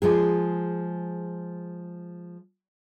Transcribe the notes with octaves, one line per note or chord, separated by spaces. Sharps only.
F3 G#3 G#4